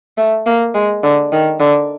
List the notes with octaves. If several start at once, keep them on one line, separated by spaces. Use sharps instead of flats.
A3
A#3
G#3
D3
D#3
D3